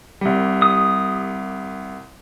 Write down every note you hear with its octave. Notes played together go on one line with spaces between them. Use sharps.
C2 G3
D#6